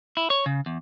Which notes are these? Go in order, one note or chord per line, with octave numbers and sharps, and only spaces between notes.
E4
C#5
C#3
E2